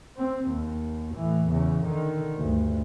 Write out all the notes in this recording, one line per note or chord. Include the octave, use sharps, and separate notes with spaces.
C4
D#2
A2 E3
E2 C#3
D3 D#3
D2 G2